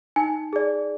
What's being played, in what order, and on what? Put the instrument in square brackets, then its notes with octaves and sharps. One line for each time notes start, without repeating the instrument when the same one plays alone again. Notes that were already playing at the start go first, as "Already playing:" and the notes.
[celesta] D#4 G#5
G#4 D5